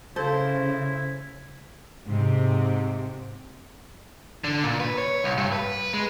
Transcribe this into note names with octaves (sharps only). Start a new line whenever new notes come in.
C#3 E4 A4 C5 F5
G#2 C3
D3
A#2
B4
C#5
C2
G2
B4
G#3